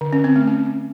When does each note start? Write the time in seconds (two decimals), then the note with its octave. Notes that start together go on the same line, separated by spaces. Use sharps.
0.01 D3
0.13 C#4
0.24 C4
0.36 A3
0.47 C#4